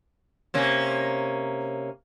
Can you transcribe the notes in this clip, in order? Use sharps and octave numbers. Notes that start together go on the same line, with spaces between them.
C3 A#3 C#4